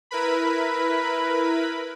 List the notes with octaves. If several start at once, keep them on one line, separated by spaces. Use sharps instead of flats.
E4 A#4 B4 B5